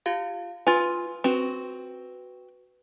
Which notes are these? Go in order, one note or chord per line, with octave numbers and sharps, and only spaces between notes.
F4 G4 F5
F4 B4 G#5
C4 F#4 B4